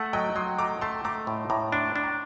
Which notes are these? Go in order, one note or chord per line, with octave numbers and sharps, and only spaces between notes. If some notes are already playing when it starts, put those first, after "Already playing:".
Already playing: A3 F#5 A5
F#3 D#5 G5
F#3 C6 D#6
A3 A#5 D6
A3 A5 C6
A3 A#5 D6
A2
A2 A#5 D6
D4 A5 C6
D4
G5 A#5